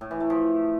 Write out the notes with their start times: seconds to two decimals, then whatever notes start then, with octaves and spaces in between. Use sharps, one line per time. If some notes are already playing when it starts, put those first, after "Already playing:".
0.01 A2
0.11 E3
0.20 A3
0.30 F3